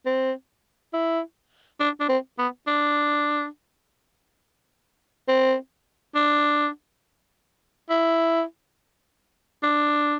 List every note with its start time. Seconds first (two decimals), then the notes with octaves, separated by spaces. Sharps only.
0.06 C4
0.94 E4
1.80 D4
2.00 D4
2.09 C4
2.39 B3
2.67 D4
5.28 C4
6.15 D4
7.90 E4
9.63 D4